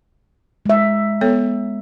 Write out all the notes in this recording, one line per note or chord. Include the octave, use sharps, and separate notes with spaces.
G#3 E5
B3 A4 C#5